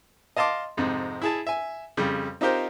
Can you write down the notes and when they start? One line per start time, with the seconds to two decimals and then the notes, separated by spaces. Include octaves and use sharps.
0.37 D#5 F5 A5 C6 D6
0.77 F2 G#2 C3
1.22 E4 G#4 A5
1.47 E5 G#5
1.97 F2 C#3 G3
2.41 C4 D#4 F4 G4 A#4 C5